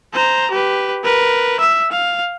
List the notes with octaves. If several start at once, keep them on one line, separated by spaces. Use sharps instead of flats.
C5 A#5
G4 B4
A#4 B4
E5 E6
F5